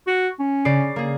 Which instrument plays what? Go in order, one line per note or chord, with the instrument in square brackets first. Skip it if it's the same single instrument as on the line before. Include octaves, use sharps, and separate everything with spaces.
[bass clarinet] F#4
C#4
[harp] C#3 D5 C7
A#3 G#4